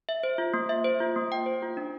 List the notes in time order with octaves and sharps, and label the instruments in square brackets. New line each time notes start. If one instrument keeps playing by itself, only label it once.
[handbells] E5
C5
F4
A#3
E5
C5
F4
A#3
G5
C5
F4
D4